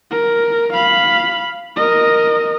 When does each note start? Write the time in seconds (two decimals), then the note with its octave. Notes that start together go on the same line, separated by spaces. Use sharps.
0.11 A#4
0.74 F5 B5
1.76 A#4 D#5